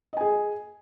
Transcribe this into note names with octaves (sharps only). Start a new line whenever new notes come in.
G#4 D#5 G#5